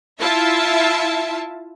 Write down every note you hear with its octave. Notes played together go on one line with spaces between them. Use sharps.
E4 F4 E5 A5